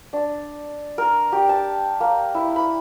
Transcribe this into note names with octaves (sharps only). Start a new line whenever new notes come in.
D4
A#4
G4
A5
A#3
E4
B5